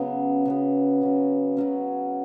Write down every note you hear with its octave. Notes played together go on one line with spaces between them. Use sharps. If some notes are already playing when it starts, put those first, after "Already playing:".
Already playing: C#3 F#3 B3
C#3 F#3 B3
C#3 F#3 C#4
C#3 F#3 C#4